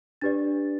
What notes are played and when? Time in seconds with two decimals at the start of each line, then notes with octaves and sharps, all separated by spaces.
0.21 D4 G4 B4 D5 A6